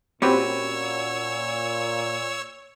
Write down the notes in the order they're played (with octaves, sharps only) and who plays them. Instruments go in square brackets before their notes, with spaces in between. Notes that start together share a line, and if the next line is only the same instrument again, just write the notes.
[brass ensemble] A#2 [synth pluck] C4 G4 [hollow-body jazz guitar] C#4 F#4 B4 [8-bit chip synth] C#5 E6